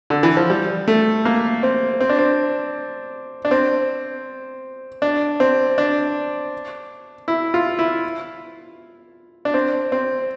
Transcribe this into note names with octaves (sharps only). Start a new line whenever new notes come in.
D3
E3
F3
G3
A3
A#3
C4
C4
D4
C4
D4
C4
D4
C4
D4
E4
F4
E4
D4
C4
C4